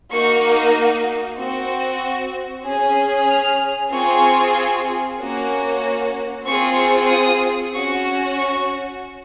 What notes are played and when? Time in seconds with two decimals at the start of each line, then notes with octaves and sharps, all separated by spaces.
0.12 A#3 D#4 F#4 C#6
1.38 C4 F#4
2.65 C#4 G#4
3.29 F6
3.92 C4 F4 G#4 C#6
5.20 A#3 C#4 F#4
6.46 C4 F4 G#4 C#6
6.78 C#6
7.10 D#6
7.74 C#4 F#4 C#6
8.38 C#6